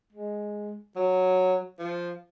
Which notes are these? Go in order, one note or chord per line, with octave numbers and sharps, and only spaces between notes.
G#3
F#3
F3